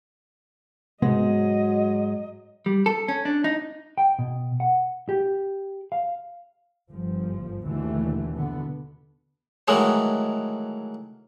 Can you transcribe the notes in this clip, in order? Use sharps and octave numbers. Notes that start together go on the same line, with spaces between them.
G#2 C3 F#3 G#3 B3 D#5 A#6
G3
A4
C#4
D4
D#4
G5
B2
F#5
G4
F5
G1 F3
D#2 B2 D3 E3 A3
B2 D3 B3
D#3 E3 F#3 G#3 A3